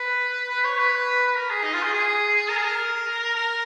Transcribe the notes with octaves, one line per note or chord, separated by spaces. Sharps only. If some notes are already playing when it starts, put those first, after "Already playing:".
Already playing: B4
B4
C#5
B4
B4
A#4
G#4
D#4
F4
G#4
G#4
A#4
G#4
A#4
A#4